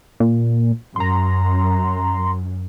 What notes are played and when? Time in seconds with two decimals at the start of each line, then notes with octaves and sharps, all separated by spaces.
0.20 A#2
0.96 F#2 A#5 C6